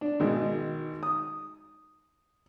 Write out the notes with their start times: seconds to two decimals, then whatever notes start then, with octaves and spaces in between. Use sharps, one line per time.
0.01 D4
0.20 G#1 B2 D#3 G#3
1.03 D#6